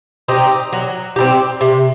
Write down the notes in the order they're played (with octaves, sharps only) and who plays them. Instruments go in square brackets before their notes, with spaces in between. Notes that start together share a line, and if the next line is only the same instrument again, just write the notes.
[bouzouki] C4 D#4 G4
F#3
C4 D#4 G4
C3